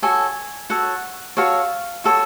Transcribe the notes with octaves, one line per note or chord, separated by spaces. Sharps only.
F#4 A4 C#5 G#5
F#4 A4 C#5 F#5
F#4 A4 C#5 F5
F#4 A4 C#5